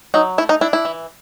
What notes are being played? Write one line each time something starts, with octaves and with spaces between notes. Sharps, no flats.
F#3 D#4
A3 E4
D#4
D4 E4
E4
E3